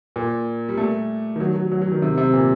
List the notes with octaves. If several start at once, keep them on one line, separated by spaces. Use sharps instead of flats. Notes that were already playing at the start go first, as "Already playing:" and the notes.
A#2
G3
A3
D#3
F#3
F#3
F#3
F#3
D#3
C3
C3
A#2